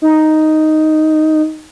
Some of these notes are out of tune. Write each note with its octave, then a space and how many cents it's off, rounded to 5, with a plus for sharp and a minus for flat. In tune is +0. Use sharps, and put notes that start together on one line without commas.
D#4 +0